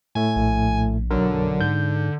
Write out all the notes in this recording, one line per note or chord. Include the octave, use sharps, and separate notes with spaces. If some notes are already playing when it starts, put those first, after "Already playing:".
A2 A3 G#5
A#1
B1 D3 F#3 A#4
F#2
G#2 G6